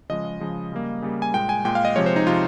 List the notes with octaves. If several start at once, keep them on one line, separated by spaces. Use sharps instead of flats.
C#3 F3 G#3 D#5
C#3 F3 G#3
C#3 G3 A#3
C#3 G3 A#3
G#5
A#2 G#3 G5
G#5
A#2 G#3 G5
F5
D#5
C3 F3 G#3 C#5
C5
D#4
C3 F3 G#3 F4